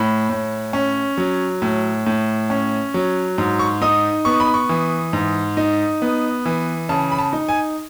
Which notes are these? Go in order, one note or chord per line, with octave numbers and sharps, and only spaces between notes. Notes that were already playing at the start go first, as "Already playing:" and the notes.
Already playing: A2 B5
A2
C#4
F#3
A2
A2
C#4
F#3
G#2
C#6
D#4 D#6
B3 C#6
B5
C#6
E3
G#2
D#4
B3
E3
C#3 A5
B5
A5
D#4
G#5